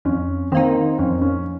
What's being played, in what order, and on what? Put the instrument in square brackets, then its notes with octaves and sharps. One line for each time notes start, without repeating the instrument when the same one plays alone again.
[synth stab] F2 [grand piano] C#4
[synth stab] D#3 A#3 D#4 [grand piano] C4
[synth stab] F2 [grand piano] C#4
[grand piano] C#4